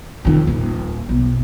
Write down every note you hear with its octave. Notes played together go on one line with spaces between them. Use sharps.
F2 D#3
D#1
B1